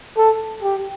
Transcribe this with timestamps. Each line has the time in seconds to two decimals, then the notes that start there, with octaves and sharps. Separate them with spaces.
0.17 A4
0.63 G4